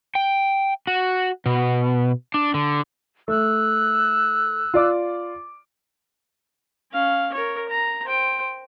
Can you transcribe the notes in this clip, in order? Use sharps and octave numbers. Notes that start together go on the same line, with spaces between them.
G5
F#4
B2
D4
D3
A3 E6 F#6
F4 D5 D6
C#4 F5
A#4 C#5
A#5
C5 G5